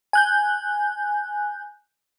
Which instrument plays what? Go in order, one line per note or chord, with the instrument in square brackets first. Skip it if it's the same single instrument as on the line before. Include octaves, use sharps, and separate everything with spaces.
[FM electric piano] G#5 F#6 G6